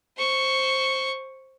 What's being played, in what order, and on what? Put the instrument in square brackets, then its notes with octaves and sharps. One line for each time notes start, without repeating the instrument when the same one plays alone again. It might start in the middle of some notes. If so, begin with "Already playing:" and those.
[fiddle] C5 C#6